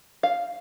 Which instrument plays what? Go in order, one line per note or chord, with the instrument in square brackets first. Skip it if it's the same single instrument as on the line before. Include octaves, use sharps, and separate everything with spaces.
[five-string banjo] F5